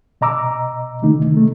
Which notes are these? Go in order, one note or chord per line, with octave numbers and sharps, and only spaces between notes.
B2 D#5 A#5 D6 E6
C3 D#3 A3 D#4
C3 A3